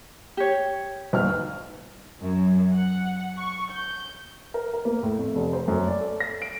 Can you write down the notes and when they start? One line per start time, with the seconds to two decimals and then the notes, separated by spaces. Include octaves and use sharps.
0.37 G4 C#5
1.13 G1 D#2 F6
2.22 F#2
2.73 F#5
3.38 C#6
3.71 G6
4.54 A#4
4.74 A#4
4.85 A#3
5.03 A2
5.18 F2
5.35 F1
5.53 C5
5.68 F#2
5.87 D5
6.01 A4
6.20 A#6
6.42 D7